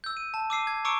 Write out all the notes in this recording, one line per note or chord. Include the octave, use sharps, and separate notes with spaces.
E6 G6
D#7
A5
D6 E6 C7 D#7
G#6
A#5 C#6 D6 E6 C#7 D7